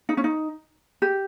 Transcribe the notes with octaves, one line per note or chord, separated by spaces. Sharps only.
D#4
C#4
D#4
G4